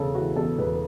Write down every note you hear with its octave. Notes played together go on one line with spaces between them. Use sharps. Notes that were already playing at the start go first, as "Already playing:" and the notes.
Already playing: E1 C#3 A4
E3 F#4
E2 A4
E1 B4